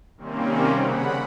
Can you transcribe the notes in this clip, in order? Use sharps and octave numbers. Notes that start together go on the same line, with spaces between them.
C3 D#3 G3 A#3 C4 C#4
C#3 F#5 B5